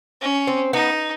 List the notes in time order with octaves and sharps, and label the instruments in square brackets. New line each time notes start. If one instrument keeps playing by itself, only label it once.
[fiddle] C#4
[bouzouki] C4
[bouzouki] B3 [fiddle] D#4